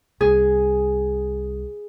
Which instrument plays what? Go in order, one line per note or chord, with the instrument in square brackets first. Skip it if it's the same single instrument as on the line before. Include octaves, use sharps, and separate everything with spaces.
[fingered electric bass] C2 [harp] G#4